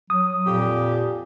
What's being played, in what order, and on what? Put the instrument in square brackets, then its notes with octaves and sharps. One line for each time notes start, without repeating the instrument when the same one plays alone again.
[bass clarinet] F#3 [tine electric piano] D#6
[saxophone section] F2 G4 [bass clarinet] A#2